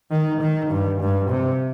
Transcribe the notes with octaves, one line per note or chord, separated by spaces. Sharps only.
D#3
D#3
G2
G2
C3